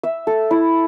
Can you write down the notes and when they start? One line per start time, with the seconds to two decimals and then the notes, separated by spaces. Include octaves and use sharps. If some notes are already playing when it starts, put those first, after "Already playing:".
0.03 E5
0.27 A4
0.51 E4